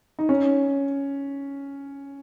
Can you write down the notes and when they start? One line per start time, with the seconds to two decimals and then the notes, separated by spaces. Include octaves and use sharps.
0.19 D#4
0.29 C#4